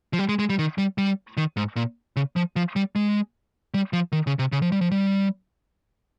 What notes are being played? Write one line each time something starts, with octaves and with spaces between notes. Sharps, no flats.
F3
G3
G#3
G#3
G3
D#3
G3
G3
D#3
G#2
A#2
C#3
F3
F3
G3
G#3
G3
F3
D#3
C#3
C3
C#3
F3
G3
F3
G3